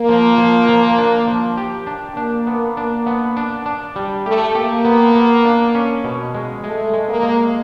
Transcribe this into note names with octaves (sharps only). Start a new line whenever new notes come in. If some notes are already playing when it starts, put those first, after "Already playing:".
Already playing: A#3
F3
F3
F3
D4
F3
G4
D4
A#3 D4
B3
D4
B3
D4
D4
G3
A3 G4
A#3 G4
B3
B3
D4
C#4
B2
G#3
G#3 A3
G#3
A#3
G#3